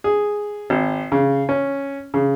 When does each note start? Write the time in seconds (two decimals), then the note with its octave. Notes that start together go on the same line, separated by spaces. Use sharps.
0.04 G#4
0.70 G#1
1.12 C#3
1.49 C#4
2.14 C#3